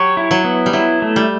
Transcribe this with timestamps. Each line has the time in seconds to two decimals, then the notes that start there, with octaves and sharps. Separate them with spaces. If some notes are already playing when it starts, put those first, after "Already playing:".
Already playing: F#3 G4 C#5
0.17 E4
0.31 F#3
0.44 B3
0.66 G3
0.73 F#3 E4
1.02 A3
1.16 G3